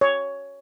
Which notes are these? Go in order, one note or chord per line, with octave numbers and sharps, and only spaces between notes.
C#5